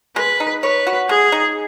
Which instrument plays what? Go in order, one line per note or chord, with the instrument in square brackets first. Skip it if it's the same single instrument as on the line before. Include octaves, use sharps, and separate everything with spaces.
[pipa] G#3 [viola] B4
[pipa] D#4
[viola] B4 [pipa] C#5
[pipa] F#4
[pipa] G#3 [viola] G#4
[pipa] D#4